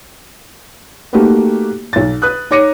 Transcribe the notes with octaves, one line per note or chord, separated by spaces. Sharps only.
A3 A#3 D#4 F#4 G4 B4
B1 A6
B4 D#6 F#6
D#4 C#5 D6 A#6 C#7 D#7